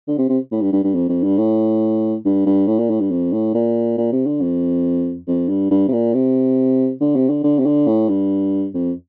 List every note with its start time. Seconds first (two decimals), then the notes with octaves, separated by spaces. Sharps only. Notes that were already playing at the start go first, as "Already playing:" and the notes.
0.08 D3
0.18 C3
0.29 C3
0.52 A2
0.62 G2
0.73 G2
0.84 G2
0.94 F2
1.09 F2
1.23 G2
1.38 A2
2.25 G2
2.46 G2
2.68 A2
2.79 A#2
2.90 A2
3.00 G2
3.11 F2
3.33 A2
3.54 A#2
3.98 A#2
4.12 C3
4.26 D3
4.41 F2
5.27 F2
5.49 G2
5.71 G2
5.88 C3
5.92 A#2
6.14 C3
7.01 D3
7.16 C3
7.29 D3
7.44 D3
7.59 C3
7.66 D3
7.87 A2
8.09 G2
8.74 F2